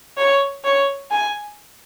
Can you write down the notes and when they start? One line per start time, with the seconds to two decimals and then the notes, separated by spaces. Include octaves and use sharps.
0.17 C#5
0.64 C#5
1.11 G#5